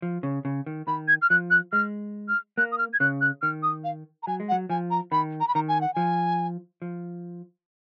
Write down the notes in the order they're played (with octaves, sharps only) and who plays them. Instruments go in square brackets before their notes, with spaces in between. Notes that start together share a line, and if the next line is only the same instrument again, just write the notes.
[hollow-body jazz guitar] F3
C#3
C#3
D#3
[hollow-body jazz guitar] D#3 [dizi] B5
[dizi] G#6
F6
[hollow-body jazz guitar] F3 [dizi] F#6
[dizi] F#6
[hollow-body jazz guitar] G#3 [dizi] F6
[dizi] F6
[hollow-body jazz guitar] A#3 [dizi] F#6
[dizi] D#6
F6
G#6
[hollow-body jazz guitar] C#3 [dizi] F#6
[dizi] F#6
[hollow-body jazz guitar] D#3 [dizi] F6
[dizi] D#6
F5
A#5
[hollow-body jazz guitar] F#3 [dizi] G#5
[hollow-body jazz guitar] G#3
[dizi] F#5
[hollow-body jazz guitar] F#3
[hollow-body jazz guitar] F3 [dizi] G#5
[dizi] A#5
[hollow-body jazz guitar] D#3 [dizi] B5
[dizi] A#5
B5
[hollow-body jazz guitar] D#3 [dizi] A#5
[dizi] G#5
F#5
[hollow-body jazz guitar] F3 [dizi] G#5
[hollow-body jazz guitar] F3